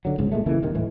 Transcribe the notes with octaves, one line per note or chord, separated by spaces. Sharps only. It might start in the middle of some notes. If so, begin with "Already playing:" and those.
D3 F#3
G1 C#2 G#2
A#2 G#3 A3
C#3 E3 A3 A#3
D#1 C3 D#3
D#1 A2 E3